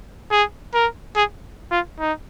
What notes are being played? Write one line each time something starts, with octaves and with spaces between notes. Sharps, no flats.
G#4
A#4
G#4
F4
D#4